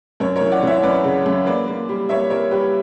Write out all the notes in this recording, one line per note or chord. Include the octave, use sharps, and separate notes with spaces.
F#2 A#4 C#5
A#4 C#5
E3
D5 F#5
E3 C#5 E5
F#2 B4 D5
C#3
F#2
A#3 B4 D5
A#3
G3
A#3 C#5 E5
G3 A#4 C#5
G3 G4 B4